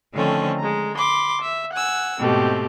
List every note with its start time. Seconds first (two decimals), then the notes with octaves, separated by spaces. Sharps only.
0.13 D3 D#3 F3 A3 C4 C#4
0.58 G#3 A#5
0.97 B5 C6 D6
1.41 E5
1.72 F#5 G#5 E6
2.19 G#2 B2 A3 C4 G4